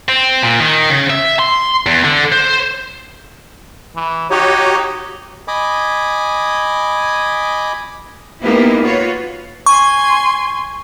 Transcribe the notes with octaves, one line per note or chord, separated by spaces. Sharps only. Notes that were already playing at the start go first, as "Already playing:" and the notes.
C4
A#2
D#3
C#3
E5
C6
E2
D3
C5
E3
D#4 F#4 G4 C#5
D#5 G#5 B5 D6 D#6
G#3 A#3 B3 D#4 E4 G4
F4 F#4 B4 C#5
G#5 C6 C#6